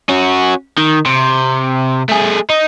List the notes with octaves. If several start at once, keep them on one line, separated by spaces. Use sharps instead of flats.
C#4 F#4
D#3
C3
A3 G#4
D#4